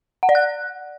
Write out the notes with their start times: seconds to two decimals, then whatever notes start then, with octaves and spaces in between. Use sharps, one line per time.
0.23 F#5
0.29 D5
0.35 F#6